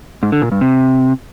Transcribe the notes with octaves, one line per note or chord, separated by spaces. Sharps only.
G#2
D3
A#2
G2
C3